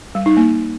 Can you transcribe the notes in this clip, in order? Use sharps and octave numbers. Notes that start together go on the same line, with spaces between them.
G3
D#4
A#3